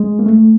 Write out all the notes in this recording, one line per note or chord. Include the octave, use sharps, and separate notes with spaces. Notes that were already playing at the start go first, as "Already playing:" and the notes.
Already playing: G#3
A#3
A3